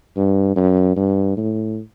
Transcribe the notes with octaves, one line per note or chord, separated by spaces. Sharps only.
G2
F#2
G2
A2